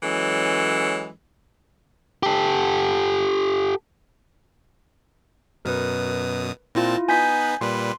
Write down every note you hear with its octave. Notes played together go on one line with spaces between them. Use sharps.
E3 F#3 G#3 C#4 A4
G4 A4
F#2 B2 A#4 B4 D#6
A#2 C4 E4 F4 A5
B3 D#4 B4 G#5 G6 B6
A#2 G3 B4 C6